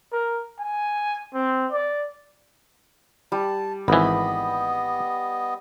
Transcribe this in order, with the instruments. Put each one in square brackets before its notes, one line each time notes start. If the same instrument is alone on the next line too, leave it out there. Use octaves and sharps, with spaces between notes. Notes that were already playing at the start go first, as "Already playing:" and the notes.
[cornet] A#4
G#5
C4
D5
[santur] G3 [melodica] A5
[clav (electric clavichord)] G#1 E3 [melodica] B3 D#5 [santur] B5